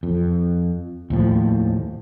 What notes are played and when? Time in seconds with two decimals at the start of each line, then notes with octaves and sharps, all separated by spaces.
0.03 F2
1.10 D#2 A2 F3